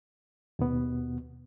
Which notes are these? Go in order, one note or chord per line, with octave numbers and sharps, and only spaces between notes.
D#2 B2 B3